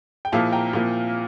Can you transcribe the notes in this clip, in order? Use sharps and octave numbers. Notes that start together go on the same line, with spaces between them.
G5
A#2 F3 A#3 E4 F5 A5
G5 A#5
A#2 F3 A#3 E4